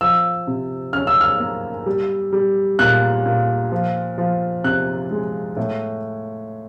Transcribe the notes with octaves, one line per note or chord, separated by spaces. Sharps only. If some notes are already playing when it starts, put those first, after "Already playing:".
F3 E6
C3
C#4 F6
E6
F6
A#3
G3
G3
A#2 F#6
A#2
F3
F3
C3 F#6
G#3
A2